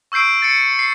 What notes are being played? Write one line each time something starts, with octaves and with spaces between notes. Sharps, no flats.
C#6 E6 G6 C7 D7
A6 C7 C#7
C7